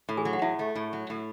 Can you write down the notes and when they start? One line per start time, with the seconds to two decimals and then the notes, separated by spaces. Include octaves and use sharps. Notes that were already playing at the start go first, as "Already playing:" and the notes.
0.09 A2
0.17 G#4 G#5
0.25 F#3
0.33 F#5
0.42 A2 E4 E5
0.59 A3
0.76 A2
0.93 F#3
1.10 A2